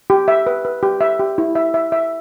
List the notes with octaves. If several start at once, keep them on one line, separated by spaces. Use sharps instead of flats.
G4
E5
B4
B4
G4
E5
G4
E4
E5
E5
E5